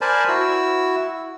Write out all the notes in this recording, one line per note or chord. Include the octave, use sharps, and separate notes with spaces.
A#4 C5 D5 G#5 A5 B5
E4 F#4 E6